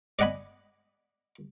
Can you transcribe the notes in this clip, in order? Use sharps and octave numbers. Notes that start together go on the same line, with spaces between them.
D5 D#5 F#5 G#5 B5